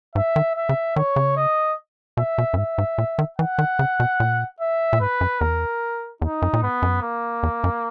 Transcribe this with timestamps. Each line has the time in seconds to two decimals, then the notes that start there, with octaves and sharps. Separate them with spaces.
0.15 G#2 E5
0.36 D#3
0.56 E5
0.69 C#3
0.96 D#3 C#5
1.16 C#3
1.37 D#5
2.17 B2 E5
2.38 B2
2.54 F#2
2.58 G#2 E5
2.78 G#2
2.98 A#2
3.19 D#3
3.39 E3 F#5
3.58 D#3
3.79 C#3
4.00 B2
4.20 A#2
4.60 E5
4.93 A#2
5.01 G#2 B4
5.21 F#2
5.40 E2 A#4
6.22 E2 D#4
6.42 F#2
6.53 A#2
6.62 G#2 B3
6.82 F#2
7.03 A#3
7.43 E2
7.64 F#2